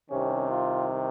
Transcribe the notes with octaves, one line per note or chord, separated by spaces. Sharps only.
C2 C3 D#3 C#4
F4